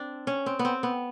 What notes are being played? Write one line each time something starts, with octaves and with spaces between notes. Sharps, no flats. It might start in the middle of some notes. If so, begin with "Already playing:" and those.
Already playing: C4 D4
C#4
C4
B3
C4
B3